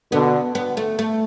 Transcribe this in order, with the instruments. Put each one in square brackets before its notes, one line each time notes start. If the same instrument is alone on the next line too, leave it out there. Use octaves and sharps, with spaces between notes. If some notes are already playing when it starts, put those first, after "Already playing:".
[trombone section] B2 D3 [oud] B3
[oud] B3
A3
A3